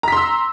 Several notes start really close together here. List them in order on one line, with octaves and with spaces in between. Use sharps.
A#5 B6 C6 E6